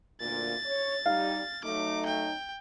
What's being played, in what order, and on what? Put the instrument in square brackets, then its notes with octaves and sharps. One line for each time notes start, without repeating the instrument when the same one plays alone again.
[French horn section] D2 A#2 [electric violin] A6
[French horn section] C#5
[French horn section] G3 D#4 [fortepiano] F5
[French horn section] F#3 A3 D#4 [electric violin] D6
[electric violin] G5